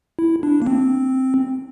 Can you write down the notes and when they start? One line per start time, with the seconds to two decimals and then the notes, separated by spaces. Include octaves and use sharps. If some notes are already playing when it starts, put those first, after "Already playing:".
0.19 E4
0.43 D4
0.62 A#3
0.67 C4